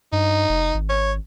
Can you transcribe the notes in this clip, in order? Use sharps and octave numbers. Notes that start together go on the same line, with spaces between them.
G2 D#4
F1
G#1
C#5